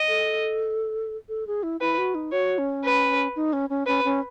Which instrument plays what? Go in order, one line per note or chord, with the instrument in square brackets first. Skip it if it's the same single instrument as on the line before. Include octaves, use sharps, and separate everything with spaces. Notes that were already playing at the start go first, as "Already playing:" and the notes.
Already playing: [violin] D#5
[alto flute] A4
A4
G#4
E4
[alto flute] E4 [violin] B4
[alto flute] F#4
D#4
[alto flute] F#4 [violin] C#5
[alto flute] C#4
[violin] B4
[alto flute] D#4
C#4
C#4
[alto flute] C#4 [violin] B4
[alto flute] C#4